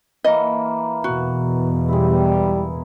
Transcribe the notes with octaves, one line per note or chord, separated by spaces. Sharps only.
E3 A#3 D#5
E2 B2 F#4
G3 G#3 E4